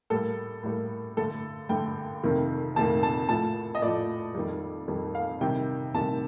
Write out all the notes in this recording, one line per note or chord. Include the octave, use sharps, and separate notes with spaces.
A2 G3 A#3 A4
A2 G3 A#3
G2 D3 A3 A4
G2 D3 A3 G5
F2 C3 D#3 A#3
F2 C3 D#3 A#3 A5
A5
A2 F3 A3 A5
D#5
A2 F3 A3 D5
F2 D#3 G3
F2 D#3 G3
F5
C3 D#3 G3 G5
C3 D#3 G3 A5